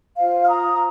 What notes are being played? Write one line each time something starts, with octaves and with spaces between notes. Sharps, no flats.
F4 C5 F5
F6
A#5 D#6